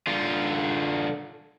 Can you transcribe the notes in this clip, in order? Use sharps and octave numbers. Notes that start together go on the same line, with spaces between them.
D3 F4